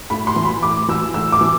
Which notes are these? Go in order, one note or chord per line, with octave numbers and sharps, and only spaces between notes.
A2 B5
C6
E3
B5
A2 D6
E3 E6
A2 E6
D6
E3